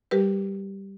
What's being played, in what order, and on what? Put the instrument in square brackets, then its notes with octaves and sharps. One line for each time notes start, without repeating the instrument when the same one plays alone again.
[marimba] G3 G4 A#4 B4